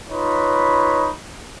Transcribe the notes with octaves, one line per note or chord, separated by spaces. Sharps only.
D#4 F4 B4 C#5 B5